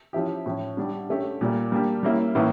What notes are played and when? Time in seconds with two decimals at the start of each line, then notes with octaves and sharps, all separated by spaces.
0.13 F3 C#4 E4 G4
0.46 A2 F3 C#4
0.77 D3 G3 D4 G4
1.09 D3 A3 C#4 G4
1.41 A#2 G3 A#3
1.72 G3 A#3 D4 G4
2.03 G3 A#3 C#4 E4
2.35 A2 E3 A#3 C#4 E4